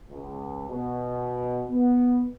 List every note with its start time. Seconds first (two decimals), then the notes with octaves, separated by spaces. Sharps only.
0.10 C#2
0.69 B2
1.68 B3